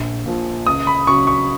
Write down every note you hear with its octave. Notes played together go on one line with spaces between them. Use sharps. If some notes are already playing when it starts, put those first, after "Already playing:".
Already playing: A#1
A#2 F3
C#2 D#6
B5
C#3 F#3 C#6
C#6